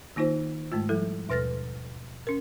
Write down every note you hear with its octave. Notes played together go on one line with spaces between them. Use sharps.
D#3 A#3 D#4 F4 C5
G#2 G#3 A3 F4
F3 G3 E4 A4
D#2 B2 B4 F6 A6 A#6
C#4 A#4